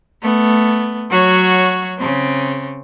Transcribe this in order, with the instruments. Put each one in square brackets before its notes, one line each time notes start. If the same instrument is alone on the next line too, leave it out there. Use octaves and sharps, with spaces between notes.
[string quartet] A3 B3
F#3 F#4 C#5
C#3 C4